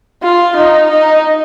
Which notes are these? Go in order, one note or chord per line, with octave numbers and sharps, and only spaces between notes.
F4
D#4
D#4